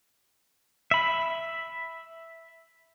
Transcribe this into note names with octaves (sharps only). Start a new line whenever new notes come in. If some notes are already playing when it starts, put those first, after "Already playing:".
E5 B5